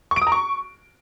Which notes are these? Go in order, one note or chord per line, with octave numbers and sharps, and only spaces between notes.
C#6
D7
D#6
A#5
C#6